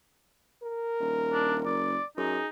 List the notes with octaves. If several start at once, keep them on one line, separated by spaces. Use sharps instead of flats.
A#4
D#1
D4
F#1 D5
F#2 D#4 G#4